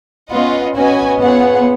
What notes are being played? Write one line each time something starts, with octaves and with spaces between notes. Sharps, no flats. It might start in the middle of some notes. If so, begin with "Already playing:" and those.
B3 C#4 F4 B4 D#5 F#5
B3 C#4 F#4 B4 D#5 G#5
B3 F4 G#4 C#5 F#5